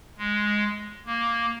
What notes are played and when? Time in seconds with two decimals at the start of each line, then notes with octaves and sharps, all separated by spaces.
0.18 G#3
1.06 A#3